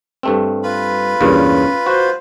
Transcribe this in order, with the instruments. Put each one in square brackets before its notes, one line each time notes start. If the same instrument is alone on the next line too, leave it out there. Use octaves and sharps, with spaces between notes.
[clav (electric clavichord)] G2 A3 C4
[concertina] F4 B4 B5
[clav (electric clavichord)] E2 G2 A#2 [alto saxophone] C#4
[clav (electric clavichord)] F#4 [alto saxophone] C5